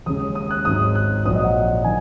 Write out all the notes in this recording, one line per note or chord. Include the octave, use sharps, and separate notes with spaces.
D#2 C#3 G#3 D#6
D#6
F#6
G#1 G#2 F#3 D#6
F#6
A#1 A#2 F#3 D#6
D#5
F#5
D#3 F#3 G#5